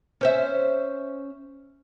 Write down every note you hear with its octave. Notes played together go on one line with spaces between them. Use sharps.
C#4 C5 E5